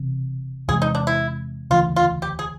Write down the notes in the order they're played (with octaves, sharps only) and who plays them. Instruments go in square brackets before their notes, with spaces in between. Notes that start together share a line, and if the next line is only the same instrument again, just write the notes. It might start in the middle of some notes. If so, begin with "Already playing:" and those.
Already playing: [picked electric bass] E1 E2 C3
[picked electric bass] E2 C3 E3 G#3 [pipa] G#4
[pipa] D#4
D4
E4
[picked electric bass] E1 D2 C#3 E3 [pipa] F4
[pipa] F4
G4
G#4